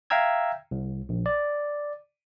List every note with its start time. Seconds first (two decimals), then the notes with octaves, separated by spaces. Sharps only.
0.10 E5 F5 G5 A#5 E6 G#6
0.71 C2
1.09 A#1
1.26 D5